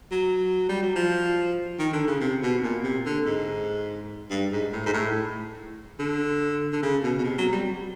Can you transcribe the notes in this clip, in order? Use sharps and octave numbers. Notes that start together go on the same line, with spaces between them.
F#3
G3
F#3
F3
D#3
D3
C#3
C3
B2
A#2
C3
D3
G#2
G2
G#2
A2
G#2
A2
D3
D3
C#3
B2
B2
C3
F#3
G3